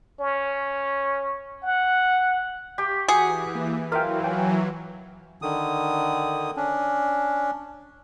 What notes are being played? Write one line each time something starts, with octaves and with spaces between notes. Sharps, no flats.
C#4
F#5
G4 C#6
E3 F#4 G#4 F#5 C#7
A#3
E3 F#3 F4 A#4 E5 F5 G5
G5 G#5
D3 D#3 D#6
C#4 D4